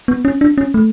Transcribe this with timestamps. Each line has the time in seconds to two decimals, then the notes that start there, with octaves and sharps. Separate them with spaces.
0.08 B3
0.25 C#4
0.41 D4
0.58 C#4
0.74 A3